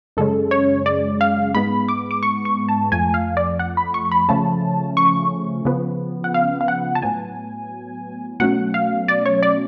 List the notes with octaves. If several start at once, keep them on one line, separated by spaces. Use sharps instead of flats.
F#2 C#3 G#3 C#4 A4
C#5
D5
F5
G#2 G#3 B3 B5
D6
D6
C#6
C#6
A5
F2 F3 A3 G#5
F5
D5
F#5
B5
C#6
B5
C#3 F3 A3 C#4 A5
C#6
C#3 F3 B3
F#5
F5
F5
F#5
A5
A2 F#3 B3 G#5
B2 F#3 A3 C#4 F#5
F5
D5
C#5
D5